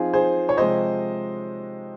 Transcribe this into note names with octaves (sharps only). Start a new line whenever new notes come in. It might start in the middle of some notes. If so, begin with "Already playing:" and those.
Already playing: F3 C4 D#4 F4 G#4
G#4 C5
C#5
C3 F3 G#3 C5 D#5